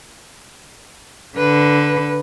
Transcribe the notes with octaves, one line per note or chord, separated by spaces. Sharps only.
D3 B4